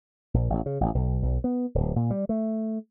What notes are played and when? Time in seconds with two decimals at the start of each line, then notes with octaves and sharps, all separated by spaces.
0.34 A#1
0.50 A1
0.66 C#3
0.81 A1
0.95 B1
1.23 B1
1.44 B3
1.75 D1
1.96 A#2
2.11 G3
2.29 A3